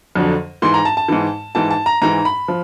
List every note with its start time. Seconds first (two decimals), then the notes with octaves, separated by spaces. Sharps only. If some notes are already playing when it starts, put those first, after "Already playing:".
0.15 F2 D3 F#3
0.62 G#2 E3 C6
0.74 A#5
0.85 A5
0.97 A5
1.08 G#2 E3
1.55 G#2 E3 A5
1.71 A5
1.86 A#5
2.02 G#2 E3 A#5
2.25 B5
2.48 F3